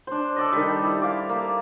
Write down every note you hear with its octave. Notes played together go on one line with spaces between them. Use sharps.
D4 C5
A4 D5 D#5
D#3 G3
E4
F5 D6
A#3